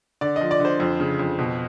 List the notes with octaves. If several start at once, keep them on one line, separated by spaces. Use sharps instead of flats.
D3 D5
F3 D#5
D5
D3
C5
F2
C#3
F2
B2